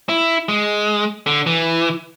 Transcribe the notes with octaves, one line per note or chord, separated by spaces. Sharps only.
E4
G#3
D3
E3